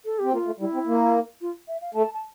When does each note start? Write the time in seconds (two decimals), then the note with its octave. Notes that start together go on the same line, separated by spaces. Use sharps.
0.05 A4
0.19 C4 G4
0.33 A#3 F4
0.46 A3
0.60 G3 E4
0.74 C4
0.87 A#3
1.41 F4
1.68 E5
1.81 F5
1.94 A3 A5
2.14 A5